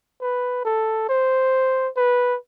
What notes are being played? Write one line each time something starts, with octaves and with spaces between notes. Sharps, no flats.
B4
A4
C5
B4